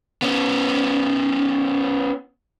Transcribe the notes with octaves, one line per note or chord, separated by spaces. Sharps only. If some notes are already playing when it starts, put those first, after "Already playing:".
B3 C#4